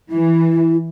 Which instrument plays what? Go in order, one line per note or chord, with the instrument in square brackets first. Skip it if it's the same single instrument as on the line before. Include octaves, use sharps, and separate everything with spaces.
[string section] E3 [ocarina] E4